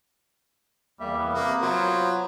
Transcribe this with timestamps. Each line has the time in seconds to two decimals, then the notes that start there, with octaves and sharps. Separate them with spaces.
1.00 E2 G3 A#3 E5
1.18 B3
1.34 C3 A#3
1.62 F#3 F4 C5